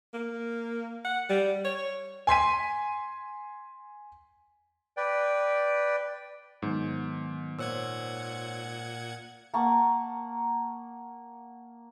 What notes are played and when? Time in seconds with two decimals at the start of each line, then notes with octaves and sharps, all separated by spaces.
0.14 A#3
1.04 F#5
1.29 G3
1.65 C#5
2.27 G#5 C6 B6 D#7
4.97 B4 D5 G5
6.62 G#2 D#3 F#3 B3
7.59 A#2 C5 C#5 F#5 E6 G#6
9.54 A#3 F#5 A5 C#6